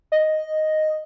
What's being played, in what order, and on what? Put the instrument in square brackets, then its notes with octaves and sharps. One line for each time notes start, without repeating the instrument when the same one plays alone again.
[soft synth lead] D#5